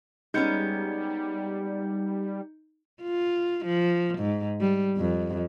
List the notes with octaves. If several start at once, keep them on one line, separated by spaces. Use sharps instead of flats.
G3 G#3 B3 C#4 D#4 G6 C#7
F4
F3
G#2
G3
F2